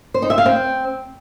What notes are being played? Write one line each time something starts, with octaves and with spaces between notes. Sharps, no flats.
C5
D#4
E5
F5
C4